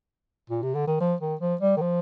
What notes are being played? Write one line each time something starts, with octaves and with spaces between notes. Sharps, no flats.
A#2
C3
D3
D#3
F3
D#3
F3
G3
D#3
F3